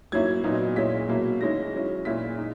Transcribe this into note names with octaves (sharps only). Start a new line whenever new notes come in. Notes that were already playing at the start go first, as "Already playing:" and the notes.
G#2 F#3 A#3 C#4 E4 G#6
A#2 F#3 B3 D#4
A#2 G#3 C#4 E4 B6
B2 F#3 A#3 E4
D#3 G#3 C#4 E4 A#6
D#3 F#3 C#4 E4
A#2 G#3 C#4 E4 B6
D#4